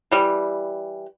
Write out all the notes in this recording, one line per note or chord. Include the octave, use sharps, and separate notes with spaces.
E3 G3